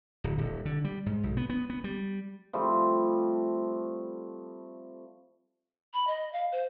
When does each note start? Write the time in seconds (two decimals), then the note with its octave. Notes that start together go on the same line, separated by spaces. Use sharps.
0.24 D1
0.38 D#1
0.65 D3
0.84 G3
1.06 G#2
1.23 B1
1.37 B3
1.49 B3
1.70 B3
1.84 G3
2.53 F3 G3 A3 C4
5.94 B5
6.07 D#5
6.33 F5
6.52 C5